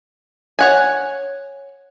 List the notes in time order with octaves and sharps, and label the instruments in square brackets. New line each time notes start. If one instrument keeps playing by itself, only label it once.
[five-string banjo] C#5 F#5 G#5